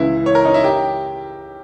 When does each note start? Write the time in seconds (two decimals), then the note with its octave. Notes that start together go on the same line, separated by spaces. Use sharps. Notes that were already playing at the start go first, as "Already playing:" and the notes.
Already playing: C#2 C#3 E3 E4
0.26 C#5
0.35 A#4
0.45 D#4
0.54 E4
0.64 G4